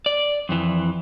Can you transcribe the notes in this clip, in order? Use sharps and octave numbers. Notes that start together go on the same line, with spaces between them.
D5
F2 E3